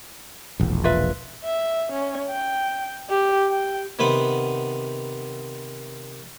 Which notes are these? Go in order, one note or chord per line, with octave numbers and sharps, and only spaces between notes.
E1 A#1
F4 B4 E5
E5
C#4
G5
G4
G5
C3 D#3 B3 B4 C5 F#5